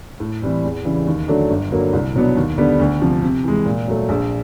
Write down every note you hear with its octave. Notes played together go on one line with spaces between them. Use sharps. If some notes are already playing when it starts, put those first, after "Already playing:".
A2
E3 G3 C4
E2
C#3 E3 G3
D#2
D3 F#3 A3 D4
G1
G2 D3 F#3 A#3
C2
B2 F#3 B3 D4
D#2
D3 G3 B3 D4
D2
C3 F3
C3
E3 G#3
A#2
F#3 A3
A#1